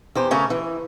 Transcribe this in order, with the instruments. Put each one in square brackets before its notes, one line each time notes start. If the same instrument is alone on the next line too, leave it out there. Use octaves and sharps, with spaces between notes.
[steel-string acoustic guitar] E2 G4 C5
C#3 A3 C#4 A#4
E3